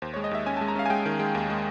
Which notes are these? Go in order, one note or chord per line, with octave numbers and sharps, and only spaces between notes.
D#2 C5
C#5
G#3
D#5
D#2 E5
C#4 G#5
A5
G#3
A#5
C#4 F5
G#5
G#3 G5
D#3
G#3
D#2
G#3